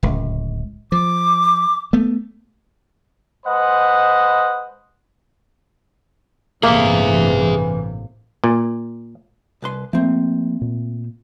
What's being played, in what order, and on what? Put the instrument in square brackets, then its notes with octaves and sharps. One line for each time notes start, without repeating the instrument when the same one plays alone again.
[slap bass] D1 C#2
[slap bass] F3 [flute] D6
[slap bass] A3 B3
[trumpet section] G#3 B4 C5 D#5 F#5 B5
[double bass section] A1 G2 C3 [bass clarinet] E3 [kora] A#3 [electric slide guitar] G#4 E5
[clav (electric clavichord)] A#2
[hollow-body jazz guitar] C2 B4 C6
[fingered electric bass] F3 A#3 [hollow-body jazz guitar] A3 C4
[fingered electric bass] A#2